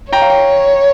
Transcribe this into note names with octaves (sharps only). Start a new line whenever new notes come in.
C#5 G5 A#5
F5
G5